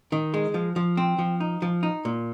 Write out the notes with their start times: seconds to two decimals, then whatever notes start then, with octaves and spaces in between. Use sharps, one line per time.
0.12 D#3
0.34 G#3
0.54 F3
0.76 F3
0.97 C4
1.19 F3
1.40 D#4
1.62 F3
1.83 D#4
2.05 A#2